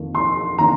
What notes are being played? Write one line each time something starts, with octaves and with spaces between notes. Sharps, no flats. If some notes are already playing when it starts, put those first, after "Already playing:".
Already playing: F2 D#3 A#3
C6
D#3 A#3 D4 A#5